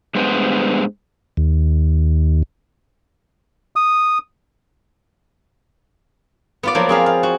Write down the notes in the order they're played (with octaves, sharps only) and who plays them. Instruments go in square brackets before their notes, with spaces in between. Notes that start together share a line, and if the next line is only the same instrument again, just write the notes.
[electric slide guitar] G2 G#3 B3 C5
[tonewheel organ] D#2
[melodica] D#6
[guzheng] B3 F4 D5
F3 F#3 A#3 B3
C4 G#4 F5 B5
F5
F#4